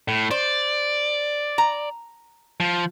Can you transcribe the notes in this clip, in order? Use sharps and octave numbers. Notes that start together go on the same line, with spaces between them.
A2
C5 D5
A#5
F3